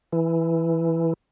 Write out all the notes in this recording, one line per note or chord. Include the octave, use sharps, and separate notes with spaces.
E3